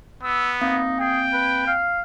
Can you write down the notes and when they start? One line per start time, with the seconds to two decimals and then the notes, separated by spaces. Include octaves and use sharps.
0.23 B3 E6
0.61 A#3 C4 D#4 F5
1.00 G#4 G5
1.33 B4
1.67 F5